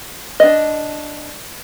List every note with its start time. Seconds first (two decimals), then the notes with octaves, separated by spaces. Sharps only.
0.40 D4 D#5